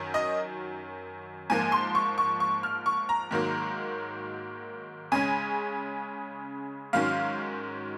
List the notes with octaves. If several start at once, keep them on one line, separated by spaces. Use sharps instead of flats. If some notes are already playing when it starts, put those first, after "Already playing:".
Already playing: F#2 D#3 F#3
D#5
G#2 F3 A#3 G#5
C6
C#6
C#6
C#6
F6
C#6
A#5
G#2 D#3 F#3 A#3
C#3 G#3 C#4 G#5
G#2 D#3 F#3 C#4 F5